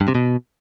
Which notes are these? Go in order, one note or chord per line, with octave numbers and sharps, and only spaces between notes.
G2
C3
B2